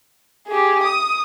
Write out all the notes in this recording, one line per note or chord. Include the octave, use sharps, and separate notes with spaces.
G4 G#4
D#6